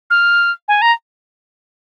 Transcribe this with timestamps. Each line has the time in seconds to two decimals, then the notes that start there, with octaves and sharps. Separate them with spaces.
0.10 F6
0.68 G#5
0.82 A#5